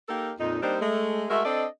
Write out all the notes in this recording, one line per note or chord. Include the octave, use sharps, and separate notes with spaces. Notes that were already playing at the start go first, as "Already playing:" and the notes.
A#3 D#4 G4 A4 A#4
F2 A#2 D#4
G3 A#3 C4 D4 D#4 C5
G#3 A3
G#3 A3 F#4 A#4 E5
C4 D4 A4 D5 D#5